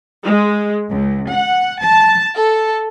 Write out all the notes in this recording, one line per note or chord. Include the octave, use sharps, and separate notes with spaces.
G#3
C#2
F#5
A5
A4